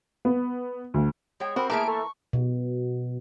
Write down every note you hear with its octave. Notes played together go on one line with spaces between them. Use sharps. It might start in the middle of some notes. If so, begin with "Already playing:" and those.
B3
D2
G#3 C#5 G5
C4 F#4 A#4 B5
E3 A3 A#3 G#4 A#4 E5 D7
A4 C#6
B2